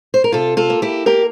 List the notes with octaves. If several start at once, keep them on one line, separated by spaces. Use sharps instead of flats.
C5
A#4
C3 F4 A4
F4 A4
A#3
E4 G4
A#3 G4 A#4